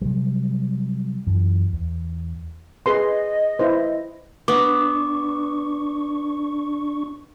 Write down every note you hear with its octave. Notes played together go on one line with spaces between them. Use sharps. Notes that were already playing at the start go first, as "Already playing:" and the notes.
C3 F#3 G3
F#2 E3
E2
G#4 B4 D#5 C6
E4 B4 C5
B3 D4 C#6 D6